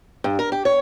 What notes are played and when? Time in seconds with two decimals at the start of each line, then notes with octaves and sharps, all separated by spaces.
0.24 G2
0.39 A#4
0.52 G4
0.65 C#5